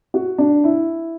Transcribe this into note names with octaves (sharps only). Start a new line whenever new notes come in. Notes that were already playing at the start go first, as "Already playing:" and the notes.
F#4
D4
E4